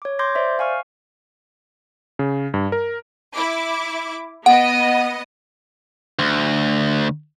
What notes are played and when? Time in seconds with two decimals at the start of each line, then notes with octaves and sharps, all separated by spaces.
0.02 C#5 D6
0.19 C6 D6 G6 G#6 A#6
0.35 C5 D5 E5
0.59 F5 G#5 C#6 F6
2.19 C#3
2.54 G2
2.72 A#4
3.35 E4 D6
4.46 B3 D#5 F#5
6.19 D2